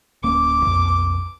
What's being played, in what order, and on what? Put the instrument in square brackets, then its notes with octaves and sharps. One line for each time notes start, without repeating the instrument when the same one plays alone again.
[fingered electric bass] D1 A#3 C#4 [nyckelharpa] D6
[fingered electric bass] B1 F2 B3